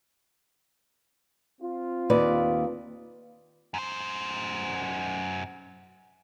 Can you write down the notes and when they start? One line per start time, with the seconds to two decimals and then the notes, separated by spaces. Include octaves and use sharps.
1.61 C4 F4
2.10 D#2 B4 D5
3.74 F#2 C5